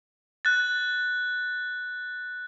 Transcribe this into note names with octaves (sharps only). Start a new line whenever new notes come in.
F#6 A6